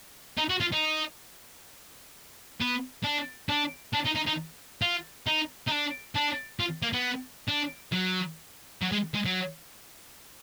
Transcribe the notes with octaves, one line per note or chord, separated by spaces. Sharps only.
D#4
F#4
F4
D#4
B3
D4
D4
D4
D#4
D#4
D#4
F4
D#4
D#4
D4
D4
F4
A#3
B3
D4
F#3
F#3
G#3
G#3
F#3